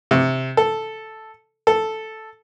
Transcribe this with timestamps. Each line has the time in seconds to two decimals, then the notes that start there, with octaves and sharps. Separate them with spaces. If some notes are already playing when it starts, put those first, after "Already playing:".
0.11 C3
0.57 A4
1.67 A4